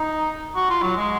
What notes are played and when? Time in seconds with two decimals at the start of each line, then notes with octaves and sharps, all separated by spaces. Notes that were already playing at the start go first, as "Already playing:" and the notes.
Already playing: D#4
0.56 F#4
0.69 F4
0.82 F#3
0.96 G#3